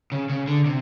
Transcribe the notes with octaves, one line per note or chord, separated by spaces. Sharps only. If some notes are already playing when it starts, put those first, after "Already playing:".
C#3
C#3
D3
C3